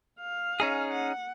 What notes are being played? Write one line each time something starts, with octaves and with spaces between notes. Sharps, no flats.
F5
C#4 D#4 G#4
F#5